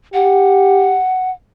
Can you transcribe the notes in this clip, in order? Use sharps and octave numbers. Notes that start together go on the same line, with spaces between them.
G4 F#5